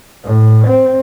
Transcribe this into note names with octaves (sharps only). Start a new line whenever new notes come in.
A2
C4